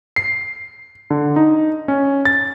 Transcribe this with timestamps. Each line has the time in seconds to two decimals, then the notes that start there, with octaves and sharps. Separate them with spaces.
0.16 C7
1.10 D3
1.36 D#4
1.88 C#4
2.25 A6